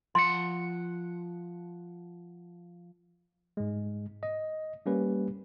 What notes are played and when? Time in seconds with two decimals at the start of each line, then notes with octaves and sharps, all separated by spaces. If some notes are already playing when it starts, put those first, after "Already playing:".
0.15 F3 F#5 C6
3.57 G#2 G#3
4.23 D#5
4.86 G3 A#3 C#4 G4 B4